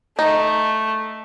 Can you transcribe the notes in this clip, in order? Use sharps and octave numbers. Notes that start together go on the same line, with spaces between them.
A3 D#4